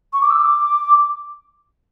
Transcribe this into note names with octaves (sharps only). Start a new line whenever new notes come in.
C#6
D6
E6
D6